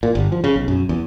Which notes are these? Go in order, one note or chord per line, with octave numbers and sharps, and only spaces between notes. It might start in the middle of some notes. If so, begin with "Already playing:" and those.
A#2
G1
F3
C#3
B1
F#2
E2